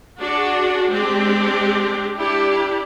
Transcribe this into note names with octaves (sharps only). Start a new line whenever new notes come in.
D4 F#4 G#4
G#3 C4 D4 G4
D4 E4 G4